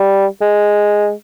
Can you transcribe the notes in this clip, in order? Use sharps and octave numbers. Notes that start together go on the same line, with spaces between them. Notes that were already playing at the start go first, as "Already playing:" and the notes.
Already playing: G3
G#3